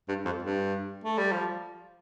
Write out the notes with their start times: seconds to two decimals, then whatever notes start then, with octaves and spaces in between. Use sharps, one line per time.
0.08 G2
0.25 F2
0.43 G2
1.04 A3
1.18 G3
1.32 F3